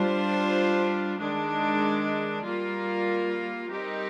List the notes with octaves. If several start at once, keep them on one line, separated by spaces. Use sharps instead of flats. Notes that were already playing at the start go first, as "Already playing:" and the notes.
Already playing: G3 D4 F4 C5
D#3 G#3 D4
G3 A#3 F4 A#4
G3 C4 D#4 G4 A#4